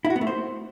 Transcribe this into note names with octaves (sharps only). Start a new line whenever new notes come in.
E4
F#4
B3
A3
C5